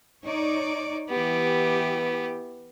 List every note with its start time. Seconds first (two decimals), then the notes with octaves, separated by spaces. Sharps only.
0.24 D#4 C#5 D5
1.09 E3 B3 G4